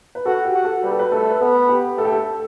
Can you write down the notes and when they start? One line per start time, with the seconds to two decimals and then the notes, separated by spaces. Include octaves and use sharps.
0.15 B4
0.25 F#4 A4
0.45 G4
0.55 F#4
0.64 A4
0.83 G3 B4
0.91 A4
0.99 B4
1.12 A3 A4
1.30 B4
1.41 B3 A4
1.69 G4
1.98 A3 A4
2.05 G4
2.12 A4